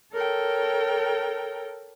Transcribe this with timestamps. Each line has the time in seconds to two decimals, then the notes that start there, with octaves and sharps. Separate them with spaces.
0.11 A4 A#4 C#5 G5